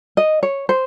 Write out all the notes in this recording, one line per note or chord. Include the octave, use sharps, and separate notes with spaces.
D#5
C#5
C5